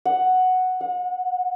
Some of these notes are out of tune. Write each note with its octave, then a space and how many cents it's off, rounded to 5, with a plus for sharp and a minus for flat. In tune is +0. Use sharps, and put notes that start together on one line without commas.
F#5 +0
F#5 -35